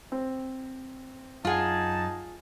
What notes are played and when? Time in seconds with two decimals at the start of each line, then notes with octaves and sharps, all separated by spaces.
0.12 C4
1.45 F#2 D#4 F4 G#4 F#5 A5